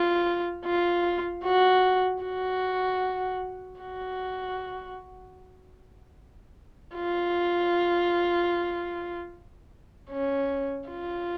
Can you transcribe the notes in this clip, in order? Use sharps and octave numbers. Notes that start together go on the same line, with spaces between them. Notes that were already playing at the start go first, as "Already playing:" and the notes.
Already playing: F4
F4
F#4
F#4
F#4
F4
C#4
F4